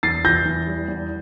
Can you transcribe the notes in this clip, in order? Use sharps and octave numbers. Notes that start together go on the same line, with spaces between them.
E2 A6 C7
E3 G6 A#6
E2
G3
E2